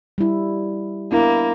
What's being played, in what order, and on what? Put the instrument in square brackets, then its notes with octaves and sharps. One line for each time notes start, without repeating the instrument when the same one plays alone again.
[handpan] G3 E4
[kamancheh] A#3 [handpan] B3 D4 E4